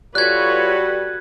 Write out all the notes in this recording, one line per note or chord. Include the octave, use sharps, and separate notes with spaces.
G3 F4 F#4 A4 B4 C#5 F#6 G#6